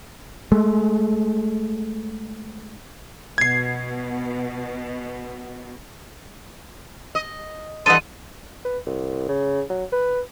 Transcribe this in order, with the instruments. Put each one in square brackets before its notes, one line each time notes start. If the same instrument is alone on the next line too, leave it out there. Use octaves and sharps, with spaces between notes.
[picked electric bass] G#3 A3
[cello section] B2 [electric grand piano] G#6 C7
[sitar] D#5
[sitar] G2 E3 [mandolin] A4 D#5 F#5 [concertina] C6 [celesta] D#7
[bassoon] B4
C2
C#3
F#3
B4